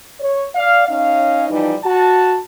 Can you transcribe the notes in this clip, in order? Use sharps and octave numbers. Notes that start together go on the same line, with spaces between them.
C#5
D5 F5
C#4 D#4 C#5 F5
E3 F3 G3 D#4
F#4 A5